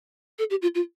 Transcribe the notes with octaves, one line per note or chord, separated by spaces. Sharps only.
A4
G4
F4
F4